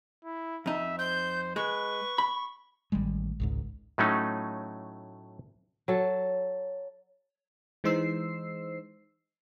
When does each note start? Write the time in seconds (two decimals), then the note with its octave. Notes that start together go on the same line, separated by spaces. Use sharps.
0.25 E4
0.66 F2 D#4 E5
0.99 C5 G6
1.56 G#3 B4 C#6
2.18 B5
2.92 A1 D#3 G3 G#3
3.40 G#1 C#2 G#2
3.98 A2 F#3 A3 C#4 D#4
5.88 F#3 A4
7.84 E3 G#3 D#4 C5 E6 C7